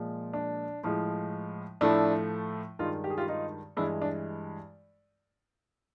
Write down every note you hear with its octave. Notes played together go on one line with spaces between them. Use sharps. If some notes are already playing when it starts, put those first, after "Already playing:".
Already playing: A#2 F3 G#3
D4
A2 F3 G#3
A2 F3 A3 D4 E4
G2 D#3 G#3 D#4 F4
G4
G#4
F4 G4
D#4 F4
G2 E3 G#3 D4 E4
D4